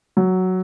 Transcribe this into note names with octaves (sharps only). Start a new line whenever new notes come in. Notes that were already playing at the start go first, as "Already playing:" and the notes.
F#3